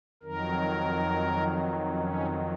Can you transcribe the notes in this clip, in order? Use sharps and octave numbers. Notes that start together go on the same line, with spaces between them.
F2 D#3 F#3 A#4
C#4